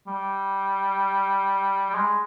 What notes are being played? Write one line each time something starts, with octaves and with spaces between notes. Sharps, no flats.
G3
G3
G#3